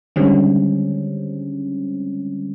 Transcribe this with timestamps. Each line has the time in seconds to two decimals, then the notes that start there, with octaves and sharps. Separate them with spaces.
0.16 D3 D#3 G3 G#3 C4 C#4